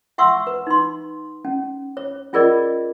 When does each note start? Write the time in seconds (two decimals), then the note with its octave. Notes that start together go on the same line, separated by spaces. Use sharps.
0.18 E5 F#5 C6 C#6 E6
0.47 B4
0.67 D#4 C6
1.45 C#4
1.97 C#5
2.33 C#4 F4 G#4 A#4 D5 D#5